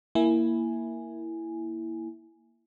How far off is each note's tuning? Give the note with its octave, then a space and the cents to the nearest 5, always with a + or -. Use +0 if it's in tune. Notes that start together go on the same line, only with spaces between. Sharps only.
A#3 +0 E4 +0 G#5 +0